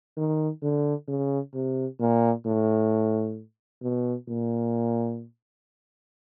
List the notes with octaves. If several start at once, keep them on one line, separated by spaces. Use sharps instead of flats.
D#3
D3
C#3
C3
A#2
A2
B2
A#2